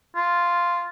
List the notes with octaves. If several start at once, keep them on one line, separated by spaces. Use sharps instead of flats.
F4